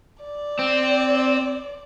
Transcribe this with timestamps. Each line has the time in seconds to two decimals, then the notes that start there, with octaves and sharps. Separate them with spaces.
0.24 D5
0.59 C4